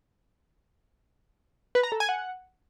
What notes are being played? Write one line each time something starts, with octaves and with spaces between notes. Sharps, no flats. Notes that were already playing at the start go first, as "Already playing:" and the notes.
B4
A#5
A4
G#5
F#5